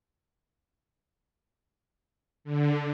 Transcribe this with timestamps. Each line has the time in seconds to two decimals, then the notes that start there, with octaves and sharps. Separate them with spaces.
2.44 D3